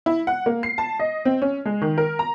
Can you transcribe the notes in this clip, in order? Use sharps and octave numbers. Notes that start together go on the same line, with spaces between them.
E4
F#5
A#3
C7
A5
D#5
C4
C#4
G#3
D#3
A#4
A#5